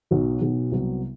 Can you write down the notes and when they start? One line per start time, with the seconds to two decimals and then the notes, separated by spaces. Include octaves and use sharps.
0.11 B1 B2 F#3
0.42 B1 B2 F#3
0.72 C2 C3 F#3 B3